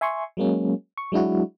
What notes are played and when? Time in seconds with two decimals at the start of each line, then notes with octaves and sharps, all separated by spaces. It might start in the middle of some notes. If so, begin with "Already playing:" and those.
0.01 E5 G#5 C6 C#6
0.37 F#3 G#3 A#3 C#4
0.97 C#6
1.12 F#3 G#3 D4 E4 F#4